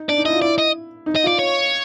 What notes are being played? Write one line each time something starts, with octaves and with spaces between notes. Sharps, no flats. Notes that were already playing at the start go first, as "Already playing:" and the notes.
Already playing: D#4
D4 D5
D#4
E4 D#5
F4
E4 D5
D#5
D#4
D#5
F4 D5
C#5